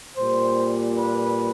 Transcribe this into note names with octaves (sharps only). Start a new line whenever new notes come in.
A#2 G3 C5
B4